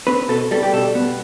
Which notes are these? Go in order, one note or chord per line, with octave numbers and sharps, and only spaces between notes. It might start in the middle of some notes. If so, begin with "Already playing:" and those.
C4 B4
B2 A4
G3 A4
G4
B2 A4
B3